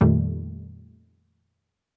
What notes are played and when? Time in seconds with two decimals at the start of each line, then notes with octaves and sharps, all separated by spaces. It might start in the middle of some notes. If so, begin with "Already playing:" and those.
0.01 F2 A#2 D#3 G3 A3